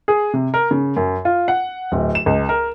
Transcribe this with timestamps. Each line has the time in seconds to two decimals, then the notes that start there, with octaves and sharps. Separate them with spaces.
0.08 G#4
0.34 C3
0.54 A#4
0.71 C#3
0.96 F#2
1.25 F4
1.48 F#5
1.92 D1
2.15 E7
2.26 C#2
2.49 A#4